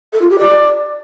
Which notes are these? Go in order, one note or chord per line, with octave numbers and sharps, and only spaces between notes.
A4
F4
G4
D5